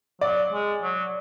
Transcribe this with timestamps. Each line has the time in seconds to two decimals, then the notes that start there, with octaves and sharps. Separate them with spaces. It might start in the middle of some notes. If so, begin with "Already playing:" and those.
0.21 F#3 D5
0.52 G#3
0.83 F#3